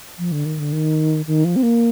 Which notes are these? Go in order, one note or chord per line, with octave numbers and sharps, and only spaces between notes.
F3
D3
D#3
D3
D#3
D#3
F3
C4
A#3